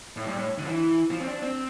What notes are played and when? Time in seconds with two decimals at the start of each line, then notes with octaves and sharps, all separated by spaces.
0.17 A2
0.27 G2
0.38 A2
0.58 D3
0.64 F3
0.69 E3
1.11 F3
1.20 C4
1.27 D4
1.43 C4